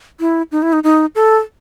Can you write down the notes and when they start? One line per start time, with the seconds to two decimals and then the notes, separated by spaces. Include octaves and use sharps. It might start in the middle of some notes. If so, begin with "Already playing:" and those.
0.20 E4
0.52 D#4
0.62 E4
0.73 D#4
0.84 D#4
1.15 A4